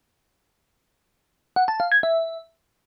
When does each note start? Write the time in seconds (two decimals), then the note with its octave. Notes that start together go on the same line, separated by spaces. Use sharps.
1.56 F#5
1.68 A5
1.80 F5
1.92 G#6
2.03 E5